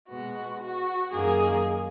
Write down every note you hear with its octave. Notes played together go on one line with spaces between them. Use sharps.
B2 G#3 B3 F#4
F#4
F#2 D#3 A#3 G#4